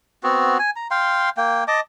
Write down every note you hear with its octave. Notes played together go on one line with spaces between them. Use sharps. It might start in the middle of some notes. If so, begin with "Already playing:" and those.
B3 C4 F#4
G#5
A#5
F5 G5 C6
A#3 G5
D#5 A5 D6